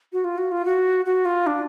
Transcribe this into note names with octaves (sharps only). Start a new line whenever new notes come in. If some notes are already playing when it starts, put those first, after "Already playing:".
F#4
F4
F#4
F4
F#4
F#4
F4
D4